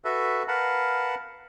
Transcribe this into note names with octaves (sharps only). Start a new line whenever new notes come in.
F#4 A4 B4 E5
A#4 B4 F5 F#5 A5 B5